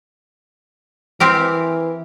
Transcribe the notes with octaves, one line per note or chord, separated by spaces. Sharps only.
E3 C4 G4 A#4